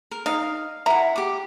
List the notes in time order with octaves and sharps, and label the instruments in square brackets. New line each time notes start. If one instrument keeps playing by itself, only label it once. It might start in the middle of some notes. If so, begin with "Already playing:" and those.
[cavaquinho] A#4
[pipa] D#4 [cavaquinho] F5
[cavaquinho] E4 F#5 [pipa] A#5
[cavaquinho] G4 D6